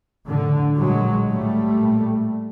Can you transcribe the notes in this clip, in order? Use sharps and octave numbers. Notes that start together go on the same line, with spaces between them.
A2 D3
A#2 F#3 G#3
A2 G3 A3
A#2